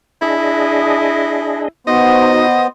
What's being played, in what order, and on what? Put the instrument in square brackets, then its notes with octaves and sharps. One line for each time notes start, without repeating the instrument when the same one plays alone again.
[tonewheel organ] D4 G#4 D#5 [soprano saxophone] E4
[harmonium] B3 C5 [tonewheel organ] D#4 F#4 [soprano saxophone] D#5